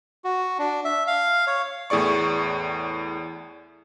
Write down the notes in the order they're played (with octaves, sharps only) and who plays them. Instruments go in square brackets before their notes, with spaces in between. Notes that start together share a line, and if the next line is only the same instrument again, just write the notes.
[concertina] F#4
D4
E5
F5
C#5
[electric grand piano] E2 A2 G#4 D5 C#6